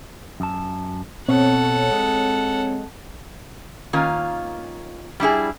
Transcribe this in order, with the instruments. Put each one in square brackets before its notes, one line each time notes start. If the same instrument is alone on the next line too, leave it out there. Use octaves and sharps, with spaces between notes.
[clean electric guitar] F#2 A5
[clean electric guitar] B2 [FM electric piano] C4 C#5 [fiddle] A4 F#5
[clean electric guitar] G#3
[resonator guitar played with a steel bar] D#3 A#3 C#4 F4
G3 D4 E4 G#4